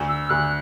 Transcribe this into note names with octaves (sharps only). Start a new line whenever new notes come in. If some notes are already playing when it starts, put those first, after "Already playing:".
Already playing: D2
E6
D2 F#6